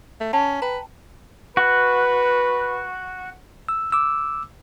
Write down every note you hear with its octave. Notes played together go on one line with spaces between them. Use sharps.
A3
C#4 F#5 A5 B5
B4 G5 A#5
F#4 B4
E6
D6 E6